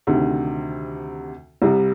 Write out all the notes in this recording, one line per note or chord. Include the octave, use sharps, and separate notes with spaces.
D2 C3 D#3
C2 C3 G3